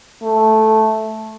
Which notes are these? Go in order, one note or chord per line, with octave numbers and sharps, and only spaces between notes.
A3